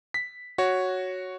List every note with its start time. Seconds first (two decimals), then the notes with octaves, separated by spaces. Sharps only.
0.14 B6
0.58 F#4 C#5